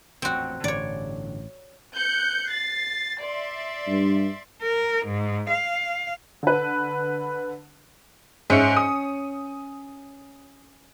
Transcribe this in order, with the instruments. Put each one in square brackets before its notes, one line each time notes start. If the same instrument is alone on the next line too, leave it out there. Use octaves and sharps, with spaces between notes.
[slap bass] A1 F2 A#2 [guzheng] C4 F#4
[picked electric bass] A1 [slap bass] G2 D3 D4 [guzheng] C#5 D5
[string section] F#6 G6 C#7
A6 C7
D5 E5 C6
[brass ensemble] G2
[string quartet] A#4
G#2
F5
[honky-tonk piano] D3 B4
[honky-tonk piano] G#2 E5 C#7 [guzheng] C#4
[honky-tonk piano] D#6